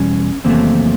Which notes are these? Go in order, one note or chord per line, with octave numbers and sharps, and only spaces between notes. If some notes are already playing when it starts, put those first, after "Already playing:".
Already playing: E2 B2 G3 C#4
E2 C3 D#3 F#3 A3 A#3 C4